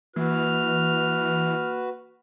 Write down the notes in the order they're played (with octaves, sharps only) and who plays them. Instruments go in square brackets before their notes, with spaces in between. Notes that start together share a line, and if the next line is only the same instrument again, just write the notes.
[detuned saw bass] E3 [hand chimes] A#3 [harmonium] F#4 B4 [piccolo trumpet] F6